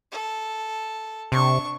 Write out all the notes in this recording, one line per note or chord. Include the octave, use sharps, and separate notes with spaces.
A4
C3 D4 C#6